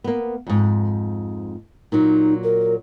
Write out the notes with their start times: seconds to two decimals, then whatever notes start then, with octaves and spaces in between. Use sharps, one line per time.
0.04 A#3 B3
0.47 F2 G#2
1.92 A#2 F#3 D#4
2.43 A#4